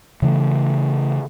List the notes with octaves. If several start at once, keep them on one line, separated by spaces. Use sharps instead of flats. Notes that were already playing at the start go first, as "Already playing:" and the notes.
C#3 E3 A3